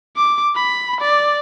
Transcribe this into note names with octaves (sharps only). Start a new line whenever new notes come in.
D6
B5
D5